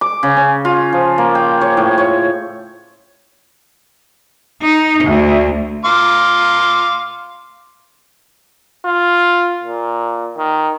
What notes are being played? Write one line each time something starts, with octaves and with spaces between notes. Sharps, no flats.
D6
C#3
C#4
F4
F3
A#3
G5
C#5
A2
C#5
D#4
D2
F5 C6 D6
F4
A#2
D#3